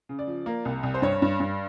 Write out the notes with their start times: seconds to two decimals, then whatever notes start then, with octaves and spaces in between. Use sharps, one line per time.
0.09 C#3
0.19 D5
0.27 F3
0.46 A#3
0.65 C2
0.83 C2
0.94 C5
1.02 G2 C#5
1.22 G2
1.40 G2